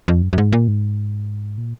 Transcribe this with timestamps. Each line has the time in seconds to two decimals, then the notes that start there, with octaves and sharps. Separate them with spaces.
0.08 F2
0.22 F#2
0.33 F#2
0.38 G#2
0.52 A#2
0.68 G#2
1.58 A#2